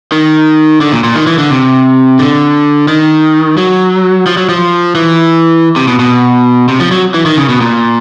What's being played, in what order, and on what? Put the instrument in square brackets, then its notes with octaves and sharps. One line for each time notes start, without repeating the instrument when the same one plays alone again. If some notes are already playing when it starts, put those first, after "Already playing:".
[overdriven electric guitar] D#3
D3
A#2
A#2
D#3
E3
D3
C3
D3
D#3
F#3
F3
F#3
F3
E3
C3
B2
B2
C3
F3
F#3
E3
D#3
C#3
B2
A#2